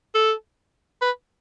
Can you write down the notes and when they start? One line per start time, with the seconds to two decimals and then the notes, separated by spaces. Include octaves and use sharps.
0.15 A4
1.02 B4